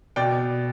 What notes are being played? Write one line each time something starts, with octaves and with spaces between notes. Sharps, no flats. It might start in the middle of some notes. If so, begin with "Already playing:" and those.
B2 D5 G5